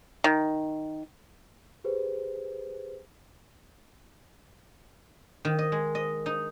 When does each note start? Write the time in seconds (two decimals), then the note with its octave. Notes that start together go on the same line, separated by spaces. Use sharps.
0.24 D#3
1.84 G4 G#4 B4 C5
5.45 D#3
5.58 D#5
5.72 G#3
5.95 D#5
6.26 D#4